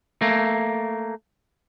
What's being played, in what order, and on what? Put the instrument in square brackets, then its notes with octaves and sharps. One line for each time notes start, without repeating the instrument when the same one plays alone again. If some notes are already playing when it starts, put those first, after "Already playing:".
[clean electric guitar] A3 A#3